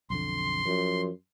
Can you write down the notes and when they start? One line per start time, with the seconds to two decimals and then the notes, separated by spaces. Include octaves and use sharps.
0.10 B1 F2 D3 C6
0.66 F#2 F3